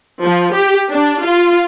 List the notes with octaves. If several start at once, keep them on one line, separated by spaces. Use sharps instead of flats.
F3
G4
D4
F4